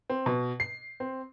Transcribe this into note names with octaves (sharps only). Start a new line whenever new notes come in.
C4
B2
C7
C4